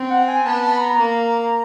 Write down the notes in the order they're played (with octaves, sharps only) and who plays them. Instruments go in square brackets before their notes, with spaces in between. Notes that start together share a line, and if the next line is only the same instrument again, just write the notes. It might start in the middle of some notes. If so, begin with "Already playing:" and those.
Already playing: [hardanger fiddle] C4
[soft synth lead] F#5
G#5
[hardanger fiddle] B3 [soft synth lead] A5
[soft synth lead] A5
B5
A#5
[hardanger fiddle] A#3